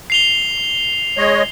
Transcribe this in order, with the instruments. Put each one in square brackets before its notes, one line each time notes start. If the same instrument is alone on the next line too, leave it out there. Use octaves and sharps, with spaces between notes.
[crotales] C7 F7 G7
[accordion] G#3 C#5 D#5